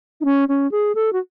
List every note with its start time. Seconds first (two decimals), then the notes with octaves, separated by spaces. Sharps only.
0.21 D#4
0.25 C#4
0.49 C#4
0.71 G#4
0.95 A4
1.13 F#4